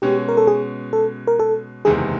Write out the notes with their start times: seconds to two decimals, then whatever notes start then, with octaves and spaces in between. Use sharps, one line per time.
0.02 B2 G#3 C#4 G4
0.29 A#4
0.37 A4
0.47 G#4
0.93 A4
1.27 A#4
1.40 A4
1.85 F#1 E2 C3 D#3 G#3 G#4